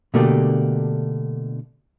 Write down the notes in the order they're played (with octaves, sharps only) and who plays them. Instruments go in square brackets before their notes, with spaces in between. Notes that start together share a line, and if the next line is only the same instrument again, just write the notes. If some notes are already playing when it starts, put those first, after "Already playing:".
[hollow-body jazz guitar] B2 D3 A3 A#3 D4 G4